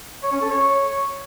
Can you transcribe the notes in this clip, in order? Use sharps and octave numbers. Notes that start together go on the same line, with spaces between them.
C#5
C#4
A4
C#5